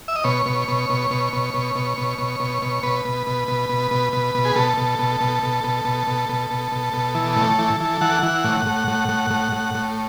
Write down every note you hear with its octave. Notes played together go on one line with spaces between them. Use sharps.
E5
D#5
B2 C#5
B2
B2
B2
B2
B2
B2
B2
B2
B2
B2
B2
B2 B4
B2
B2
B2
B2
B2
B2
B2
G#4
B2 A4
B2
B2
B2
B2
B2
B2
B2
B2
B2
B2
B2
E3
A2
E3
E3
E3 F#5
E3
A2
A2
A2
A2
A2
A2
A2